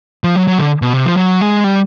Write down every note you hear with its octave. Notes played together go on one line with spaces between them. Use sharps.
F3
F#3
F#3
D3
B2
C3
F3
F#3
G#3
G3